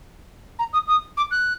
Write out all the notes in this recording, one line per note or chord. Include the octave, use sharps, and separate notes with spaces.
A#5
D#6
D#6
D6
F#6